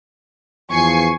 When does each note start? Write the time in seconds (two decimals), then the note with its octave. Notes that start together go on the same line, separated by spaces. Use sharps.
0.71 E2 F3 G#5 C#6 C7